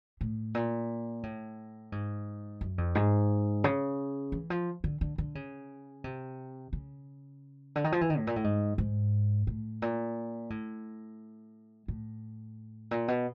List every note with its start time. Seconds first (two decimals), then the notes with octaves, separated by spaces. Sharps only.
0.21 A2
0.55 A#2
1.23 A2
1.92 G#2
2.61 F#2
2.78 F2
2.95 G#2
3.64 C#3
4.32 E3
4.50 F3
4.84 D3
5.01 D3
5.18 D3
5.35 C#3
6.04 C3
6.73 C#3
7.76 D3
7.84 D#3
7.92 F3
8.01 E3
8.10 D#3
8.18 A2
8.27 A#2
8.36 A2
8.44 G#2
8.78 G#2
9.47 A2
9.82 A#2
10.50 A2
11.88 A2
12.91 A#2
13.08 B2